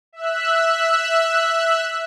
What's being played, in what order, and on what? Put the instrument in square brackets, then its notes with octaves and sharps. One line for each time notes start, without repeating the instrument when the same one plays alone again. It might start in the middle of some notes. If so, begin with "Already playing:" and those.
[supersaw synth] E5 E6 F#6